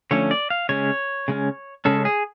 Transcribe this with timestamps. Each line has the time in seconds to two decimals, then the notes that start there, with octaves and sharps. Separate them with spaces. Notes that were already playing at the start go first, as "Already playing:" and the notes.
0.11 D3 F3 A3 C#4 C#5
0.31 D5
0.50 F5
0.69 C#3 G#3 C#4 C#5
1.28 C#3 G#3 C#4
1.85 C#3 G#3 C#4 A4
2.05 G#4